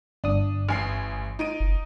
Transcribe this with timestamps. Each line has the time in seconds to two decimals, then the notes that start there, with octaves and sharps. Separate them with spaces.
0.24 G1 D4 D#6
0.69 A1 G#5 C7
1.39 D#4 D7 D#7
1.60 F#1